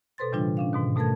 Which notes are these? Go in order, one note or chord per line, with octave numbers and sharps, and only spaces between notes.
B2 A4 B4 C5 C6 A6
A2 C#3 E3 G3 D4 F4
C#4 D4 F5
G#2 B2 D#3
B2 A3 A4 A#4 A5 G#6